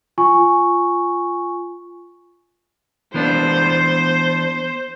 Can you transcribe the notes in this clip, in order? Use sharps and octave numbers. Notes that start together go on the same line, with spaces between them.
F4 G#5 C#6
E3 B3 D4 C5